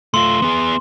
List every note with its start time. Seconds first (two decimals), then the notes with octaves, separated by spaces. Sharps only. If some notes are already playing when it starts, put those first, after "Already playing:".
0.14 A3 F4 C6
0.42 B3 G#4